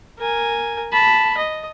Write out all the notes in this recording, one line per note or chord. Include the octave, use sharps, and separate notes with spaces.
A#4 G#5
A5 B5
D#5